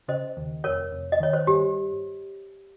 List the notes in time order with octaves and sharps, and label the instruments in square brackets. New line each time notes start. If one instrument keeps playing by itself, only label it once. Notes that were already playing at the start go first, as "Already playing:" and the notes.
[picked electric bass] C#3 [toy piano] C5 D#5
[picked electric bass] D#2
[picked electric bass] F1 [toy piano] A#4 C#5
[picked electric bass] F1
[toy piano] D#5
[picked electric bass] D#3 [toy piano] C#5
[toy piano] C5
[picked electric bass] G2 [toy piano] G4